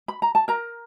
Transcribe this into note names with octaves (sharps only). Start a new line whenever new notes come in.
B5
A#5
A5
A#4 A#5